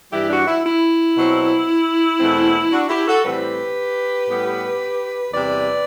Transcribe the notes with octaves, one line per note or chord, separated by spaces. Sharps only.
G2 E3 G3 E4 G4
D4 F#4
E4
E4
B2 F#3 C4
E2 B2 A3 C4
D4 F#4
E4 G4
F#4 A4
A2 E3 G3 C4 G4 B4
A2 G3 B3
E2 C3 G3 B4 D5